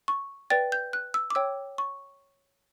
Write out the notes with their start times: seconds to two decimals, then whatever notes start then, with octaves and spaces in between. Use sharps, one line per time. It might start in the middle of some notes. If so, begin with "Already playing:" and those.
0.08 C#6
0.50 B4 D5 G5 A6
0.72 G6
0.93 F#6
1.14 E6
1.30 D6
1.35 C#5 G5 E6
1.78 C#6